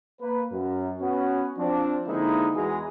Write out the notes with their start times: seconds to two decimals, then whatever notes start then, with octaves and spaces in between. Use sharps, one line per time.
0.20 A#3 B4
0.52 F#2
1.00 B3 C#4 F#4
1.58 F3 C4 D4
2.06 D3 G#3 A#3 C4 D#4 E4
2.55 E2 E3 G#3 F#4 G#4 A#5